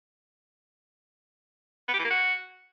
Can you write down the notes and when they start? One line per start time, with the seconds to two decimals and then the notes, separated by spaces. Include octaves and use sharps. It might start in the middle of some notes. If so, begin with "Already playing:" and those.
1.88 B3
1.94 G4
1.99 E3
2.05 A#3
2.10 F#4